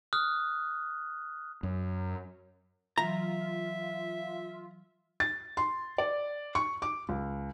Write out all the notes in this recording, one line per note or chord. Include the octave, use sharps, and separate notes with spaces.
D#6 F6 F#6
F#2
E3 F#3 F4 E5 A#5
A6
C6
D5
C#6
D6
C#2